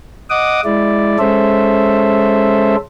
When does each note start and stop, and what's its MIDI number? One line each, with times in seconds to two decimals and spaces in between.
0.30 0.61 75
0.30 0.61 78
0.30 0.61 86
0.30 0.61 87
0.65 1.18 56
0.65 1.18 64
0.65 1.18 74
1.19 2.76 56
1.19 2.76 61
1.19 2.76 69
1.19 2.76 72
1.19 2.76 76